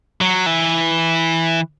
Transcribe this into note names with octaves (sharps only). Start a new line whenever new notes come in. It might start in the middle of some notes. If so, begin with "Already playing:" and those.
F#3
E3